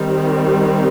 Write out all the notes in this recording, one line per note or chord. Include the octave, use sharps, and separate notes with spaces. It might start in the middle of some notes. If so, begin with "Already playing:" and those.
Already playing: D#3 G3 C4